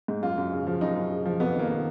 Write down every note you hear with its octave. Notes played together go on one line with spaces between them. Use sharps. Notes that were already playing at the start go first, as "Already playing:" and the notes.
G#2
F#2 F4
F#2
C#3
F3
F#2 D#4
F#2
C#3
F3
F2 B3
D#3 A#3
D#3